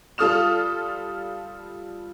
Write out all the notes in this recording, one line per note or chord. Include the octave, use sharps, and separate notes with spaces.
G3 F4 A4 D#6 F6 E7